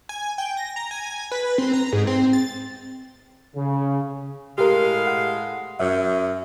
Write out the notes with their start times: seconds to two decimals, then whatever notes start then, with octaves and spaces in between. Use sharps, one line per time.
0.09 G#5
0.38 G5
0.57 A#6
0.76 A#5
0.91 G#5
1.31 B4
1.58 C4
1.74 A#5
1.93 G#2
2.07 C4
2.33 A6
3.55 C#3
4.58 A2 G#3 G4 A#4 F5
5.07 F#5
5.80 F#2 E5